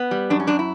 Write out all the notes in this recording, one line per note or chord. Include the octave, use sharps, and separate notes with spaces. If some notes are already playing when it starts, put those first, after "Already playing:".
Already playing: B3
G3
F#2 D4
C#4
F#2 D4
E4